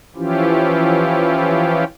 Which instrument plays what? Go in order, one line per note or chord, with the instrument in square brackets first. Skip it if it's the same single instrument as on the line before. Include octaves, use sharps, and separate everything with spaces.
[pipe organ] E3 F3 C#4 E4 F4 G4